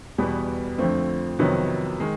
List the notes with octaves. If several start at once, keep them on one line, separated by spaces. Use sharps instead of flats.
E2 B2 G3 B3
F2 D3 F3 A3 C4
F2 C3 D#3 F#3 B3
D#3 G#3